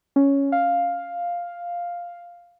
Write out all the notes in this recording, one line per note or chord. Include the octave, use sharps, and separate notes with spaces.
C#4
F5